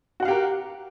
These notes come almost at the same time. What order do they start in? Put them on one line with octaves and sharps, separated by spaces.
F#4 F#5 F5 G4 A#4